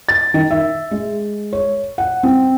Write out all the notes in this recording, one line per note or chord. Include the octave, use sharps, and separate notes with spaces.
A6
D#3
E5
G#3
C#5
F#5
C4